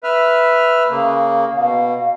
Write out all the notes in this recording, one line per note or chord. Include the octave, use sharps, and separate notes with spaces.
B4 E5 F6
C#3 A#3
B2 F5